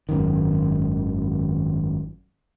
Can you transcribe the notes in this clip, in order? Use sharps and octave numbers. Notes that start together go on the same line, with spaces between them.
G#1 F#2 D#3